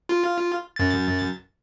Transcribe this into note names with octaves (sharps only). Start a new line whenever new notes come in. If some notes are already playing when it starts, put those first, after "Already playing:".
F4
F#2 A6